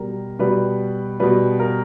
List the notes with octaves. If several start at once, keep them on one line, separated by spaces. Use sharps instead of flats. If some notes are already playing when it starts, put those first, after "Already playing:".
Already playing: B2 G3 A#4
B2 G3 B4
B2 G3 B4
A#4